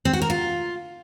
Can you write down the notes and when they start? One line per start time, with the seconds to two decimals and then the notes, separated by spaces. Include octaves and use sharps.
0.05 C4
0.13 F#4
0.22 A#4
0.30 F4